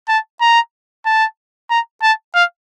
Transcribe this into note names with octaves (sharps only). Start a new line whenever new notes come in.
A5
A#5
A5
A#5
A5
F5